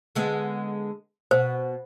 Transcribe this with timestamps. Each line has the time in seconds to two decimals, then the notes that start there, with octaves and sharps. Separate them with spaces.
0.15 D3 G#3 B3
1.31 B2 C5